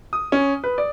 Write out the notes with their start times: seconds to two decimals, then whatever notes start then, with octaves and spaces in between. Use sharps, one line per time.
0.13 D#6
0.32 C#4
0.64 B4
0.78 D5